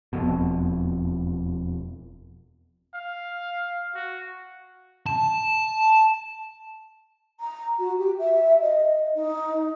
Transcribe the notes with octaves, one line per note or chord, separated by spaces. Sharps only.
E1 F2 B2
F5
F#4
A5
A#5
F#4
G4
E5
D#5
D#4